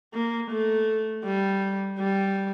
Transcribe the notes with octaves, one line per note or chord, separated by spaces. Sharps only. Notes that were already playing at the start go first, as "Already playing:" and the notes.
A#3
A3
G3
G3